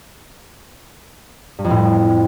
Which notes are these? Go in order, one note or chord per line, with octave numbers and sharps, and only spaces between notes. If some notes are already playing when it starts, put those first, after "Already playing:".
G2
F2
A2